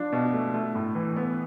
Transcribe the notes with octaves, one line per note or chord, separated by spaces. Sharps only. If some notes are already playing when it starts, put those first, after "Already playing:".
Already playing: F3 D4
B2
A3
A3
A2
E3
B3